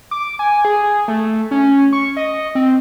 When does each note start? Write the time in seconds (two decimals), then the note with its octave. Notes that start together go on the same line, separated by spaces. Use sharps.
0.11 D6
0.39 G#5
0.65 G#4
1.08 A3
1.51 C#4
1.93 C#6
2.17 D#5
2.55 C4